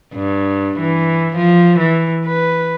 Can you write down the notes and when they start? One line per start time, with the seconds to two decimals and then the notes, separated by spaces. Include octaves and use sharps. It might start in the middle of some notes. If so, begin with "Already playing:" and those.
0.15 G2
0.79 E3
1.37 F3
1.80 E3
2.26 B4